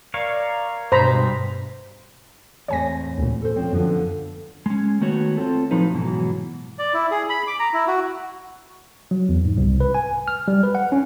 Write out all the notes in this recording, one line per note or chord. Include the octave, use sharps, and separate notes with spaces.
A#4 C#5 D5 F5
G2 B2 G#3 C5 A#5 B5
E2 A2 C4 C#5 G#5 A#6
D2 A#2
A4 C5
F3 C4 C#4
F#2 D3 F3 B3
G#3 C#4
D#3 A3 B3 F#4 C#5
C4 F4 A4
A2 F3 F#3 D#4 B4
G#2 B2 E3 F#3
D5
E4
G#4
B5
D6
A#5
E4
F#4
F#3
E2
G#2
C2
B4
G#5
F6
G3
B4
F#5
C#4